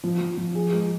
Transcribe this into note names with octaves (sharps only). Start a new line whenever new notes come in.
F3
F3
F3
G#4
G#3